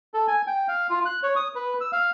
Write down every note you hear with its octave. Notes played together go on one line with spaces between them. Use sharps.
A4
G#5
G5
F5
F4
F#6
C#5
D#6
B4
E6
F5